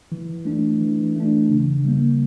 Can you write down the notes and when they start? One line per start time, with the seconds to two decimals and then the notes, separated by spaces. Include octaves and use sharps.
0.12 E3
0.45 A3 D4
0.81 E3
1.15 A3 D4
1.50 C#3
1.84 G3 A#3